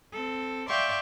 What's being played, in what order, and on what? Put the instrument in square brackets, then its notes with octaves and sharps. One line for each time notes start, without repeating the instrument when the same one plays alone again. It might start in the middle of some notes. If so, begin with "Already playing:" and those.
[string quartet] C4 A4
D5 E5 F5 G5 C6 C#6